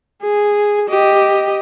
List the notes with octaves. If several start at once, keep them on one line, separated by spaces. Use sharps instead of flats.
G#4
G4 D#5